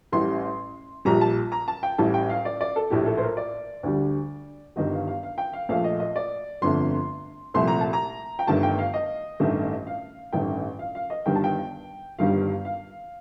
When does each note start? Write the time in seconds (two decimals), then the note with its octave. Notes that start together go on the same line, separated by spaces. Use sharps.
0.12 A1 A2 G3 C6
1.05 A#1 A#2 G3 A#5
1.21 A5
1.52 A#5
1.68 A5
1.83 G5
1.98 A1 A2 G3 A5
2.14 G5
2.30 F5
2.45 D5
2.61 D5
2.76 A4
2.90 A#1 A2 A3 G4
3.06 A4
3.17 C5
3.22 A#4
3.37 D5
3.83 D2 D3 G3
4.76 G1 G2 D#3 G3 D#5
4.93 F5
5.07 F5
5.23 F5
5.38 G5
5.53 F5
5.69 A#1 A#2 F3 A3 F5
5.84 D#5
6.00 D#5
6.16 D5
6.62 G1 F2 D3 A3 C6
7.54 C2 A#2 F3 A3 C6
7.67 A#5
7.80 A5
7.93 A#5
8.39 G5
8.47 G1 G2 D#3 A3 A5
8.63 G5
8.79 F5
8.94 D#5
9.40 A1 G2 D#3 A3
9.87 F5
10.33 A1 G2 D#3 A3 G5
10.79 F5
10.95 F5
11.10 D#5
11.26 G1 G2 D#3 G3 G5
11.35 A5
11.44 G5
12.19 G1 G2 D#3 G3 F5
12.65 F5